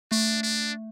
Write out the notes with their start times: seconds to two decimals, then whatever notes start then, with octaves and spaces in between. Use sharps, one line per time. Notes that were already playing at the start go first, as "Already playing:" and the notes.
0.12 A3 D4
0.43 D4